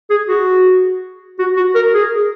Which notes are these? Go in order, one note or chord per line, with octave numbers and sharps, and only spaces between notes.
G#4
F#4
F#4
F#4
A#4
G#4